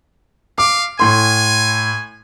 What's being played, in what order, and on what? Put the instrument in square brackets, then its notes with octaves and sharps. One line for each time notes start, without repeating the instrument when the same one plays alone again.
[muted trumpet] F5 [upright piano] D6
[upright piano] A2 C6 [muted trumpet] G#5